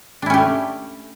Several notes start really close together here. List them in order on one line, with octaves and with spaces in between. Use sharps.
D4 E4 C#4 G4 A3